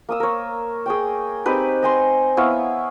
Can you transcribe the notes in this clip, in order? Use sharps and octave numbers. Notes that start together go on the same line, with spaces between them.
A#3 D#6 E6
A#4 C#5
G#4 C#5 G5
C4 D#4 G4 B4
D#5 G#5 C6
B3 E4 C#5 F5